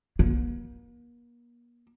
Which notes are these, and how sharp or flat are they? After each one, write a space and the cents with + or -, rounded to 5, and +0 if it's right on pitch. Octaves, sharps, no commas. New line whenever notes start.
A#3 +40